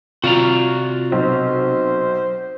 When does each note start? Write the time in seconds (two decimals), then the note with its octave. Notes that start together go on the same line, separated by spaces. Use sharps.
0.24 C3 F4 F#4 D5 A#5
1.12 B1 C5